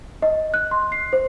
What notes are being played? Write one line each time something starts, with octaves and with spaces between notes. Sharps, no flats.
D#5
F#6
C6
C7
C5